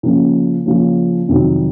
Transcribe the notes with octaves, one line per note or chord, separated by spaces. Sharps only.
C#3 F3 A#3 C#4
C#3 F3 A#3 C#4
F2 C3 D#3 F#3